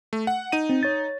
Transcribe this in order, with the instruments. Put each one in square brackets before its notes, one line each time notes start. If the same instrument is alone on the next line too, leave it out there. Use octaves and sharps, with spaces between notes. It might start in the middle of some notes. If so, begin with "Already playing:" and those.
[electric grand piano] A3
F#5
D#4 D#7
[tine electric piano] C4
C#5 A6